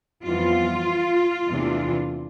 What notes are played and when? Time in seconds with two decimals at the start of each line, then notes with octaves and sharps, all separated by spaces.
0.24 F2 E3 G3 B3 F4
1.48 E2 C3 E3 A3 D4